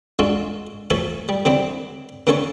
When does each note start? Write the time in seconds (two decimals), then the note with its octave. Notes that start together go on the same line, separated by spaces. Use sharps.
0.19 G#3 D4 F4 F#4 A4
0.90 F3 F#3 A3 F#4 A4 G#5
1.29 G3
1.45 D3 F#3 C4 D4 E4 G4
2.27 D3 A#3 C#4 A4 G#5 C#6